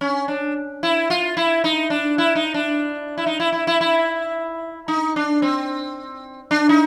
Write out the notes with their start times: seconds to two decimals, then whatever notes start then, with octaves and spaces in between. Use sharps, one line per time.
0.01 C#4
0.28 D4
0.83 E4
1.10 F4
1.37 E4
1.64 D#4
1.90 D4
2.18 E4
2.35 D#4
2.54 D4
3.18 E4
3.26 D#4
3.40 E4
3.53 E4
3.67 E4
3.81 E4
4.88 D#4
5.16 D4
5.42 C4
6.51 D4
6.69 D#4